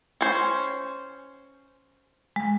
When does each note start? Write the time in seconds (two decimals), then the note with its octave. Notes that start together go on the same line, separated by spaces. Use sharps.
0.21 C#4 C5
2.36 G#3